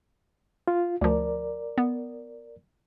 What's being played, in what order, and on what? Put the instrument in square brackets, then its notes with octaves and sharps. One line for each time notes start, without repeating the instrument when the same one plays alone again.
[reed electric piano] F4
[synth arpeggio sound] D2 F3 [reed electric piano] A#4 D5
[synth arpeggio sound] B3